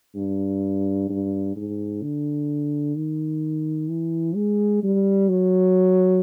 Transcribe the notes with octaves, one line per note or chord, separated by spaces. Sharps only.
G2
G2
G#2
D3
D#3
E3
G#3
G3
F#3